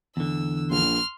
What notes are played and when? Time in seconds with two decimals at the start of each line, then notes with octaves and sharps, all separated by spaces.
0.17 E2 D3 E6
0.70 A#1 C6 F6